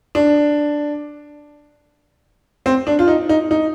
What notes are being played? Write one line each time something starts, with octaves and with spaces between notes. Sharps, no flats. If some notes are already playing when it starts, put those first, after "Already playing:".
D4
C4
D4
F4
D#4
D#4
D#4